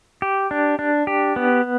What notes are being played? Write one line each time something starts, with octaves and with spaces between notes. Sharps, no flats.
G4
D4
D4
G4
B3